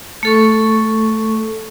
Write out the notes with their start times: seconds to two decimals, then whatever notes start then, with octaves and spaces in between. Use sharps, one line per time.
0.23 A3 A4 C#6